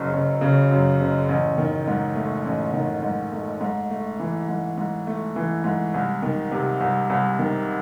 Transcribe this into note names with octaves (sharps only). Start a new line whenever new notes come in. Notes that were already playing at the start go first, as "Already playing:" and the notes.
Already playing: F#1 F#2 C#3
F#1
C#3
F#2
F#1
A1
D#3
G#2
A3
A1
D#3
G#2
A3
G#2
A3
E3
G#2
G#2
A3
E3
G#2
C2
D#3
C3
C2
C2
D#3